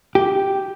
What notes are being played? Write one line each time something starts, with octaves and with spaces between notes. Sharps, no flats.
G4